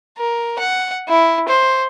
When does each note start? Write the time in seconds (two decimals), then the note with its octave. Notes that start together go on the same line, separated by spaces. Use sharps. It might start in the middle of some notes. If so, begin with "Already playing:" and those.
0.17 A#4
0.59 F#5
1.08 E4
1.48 C5